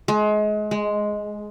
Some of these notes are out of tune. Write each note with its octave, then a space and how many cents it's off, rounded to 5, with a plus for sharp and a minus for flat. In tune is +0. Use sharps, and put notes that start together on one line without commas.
G#3 +30
G#3 +5